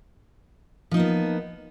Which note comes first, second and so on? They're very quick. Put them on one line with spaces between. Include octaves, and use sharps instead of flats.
F3 D#4 A#3 B3